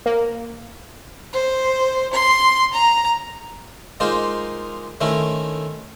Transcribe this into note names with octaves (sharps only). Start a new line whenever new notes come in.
A#3
C5
C6
A#5
G#3 A#3 D#4 F4 C5
D#3 A3 C4 C#4 E4